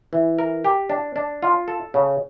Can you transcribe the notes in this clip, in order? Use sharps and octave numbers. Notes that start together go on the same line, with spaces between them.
E3
A#4
G4
D4
D4
F4
A4
C#3